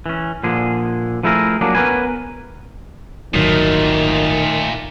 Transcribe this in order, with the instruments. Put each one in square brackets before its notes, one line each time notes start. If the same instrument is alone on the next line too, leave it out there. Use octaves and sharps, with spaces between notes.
[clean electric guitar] E3 C#4
A#2 D3 F3 G#4
F3 A3 E4 G#4 A#4
F#3 A#3 D4 G#4
B3 C#4 A#4 B4 G#5
[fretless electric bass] D1 G1 F#3 [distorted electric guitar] A#2 [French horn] D#3 [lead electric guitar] A3 D#4